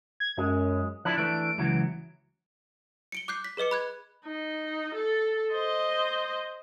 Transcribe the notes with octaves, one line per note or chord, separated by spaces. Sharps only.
G#6
F#2 G#3
F3 D4 E4 F#6
E3 A3 D4 D7
C#2 E3 F#3
C#7 D7 G7
D6 F#6 G6 C7
B6
G#4 B4 D#5 D6 C#7
B5 F#6 G#6
D#4
A4
C5 D#5